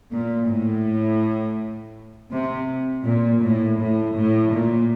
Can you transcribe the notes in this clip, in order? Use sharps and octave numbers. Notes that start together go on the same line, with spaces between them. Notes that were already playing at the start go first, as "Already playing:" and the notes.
A#2
A2
C3
A#2
A2
A2
A2
A#2